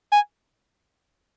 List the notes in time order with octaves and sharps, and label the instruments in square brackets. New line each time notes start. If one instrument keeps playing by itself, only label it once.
[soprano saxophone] G#5